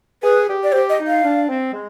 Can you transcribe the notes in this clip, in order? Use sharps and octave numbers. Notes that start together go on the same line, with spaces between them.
G#4 B4
G4
D5
G4 C5
D#5
D#4
F5
D4
C4
G#3